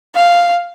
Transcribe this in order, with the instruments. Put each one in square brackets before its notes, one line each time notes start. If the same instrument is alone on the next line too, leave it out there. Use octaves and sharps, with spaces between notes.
[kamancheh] F5